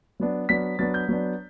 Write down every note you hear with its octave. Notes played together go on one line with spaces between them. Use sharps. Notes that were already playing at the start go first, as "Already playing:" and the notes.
F#3 B3 D4
F#3 B3 D4 B6
F#3 B3 D4 A6
G6
F#3 B3 D4